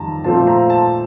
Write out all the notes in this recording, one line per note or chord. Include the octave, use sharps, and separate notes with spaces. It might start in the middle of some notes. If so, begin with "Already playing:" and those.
Already playing: F2 D#3 G3 A5 A#5
A#2 F3 A3 C4 A5
A#5
A5